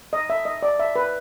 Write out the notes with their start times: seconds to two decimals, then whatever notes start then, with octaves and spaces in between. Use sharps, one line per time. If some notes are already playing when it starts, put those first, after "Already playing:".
0.13 D#5
0.30 E5
0.45 D#5
0.62 D5
0.80 E5
0.96 B4